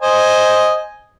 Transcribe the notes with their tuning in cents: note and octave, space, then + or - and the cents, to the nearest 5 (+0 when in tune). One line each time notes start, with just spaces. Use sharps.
C5 +0 D#5 +0 G#5 +0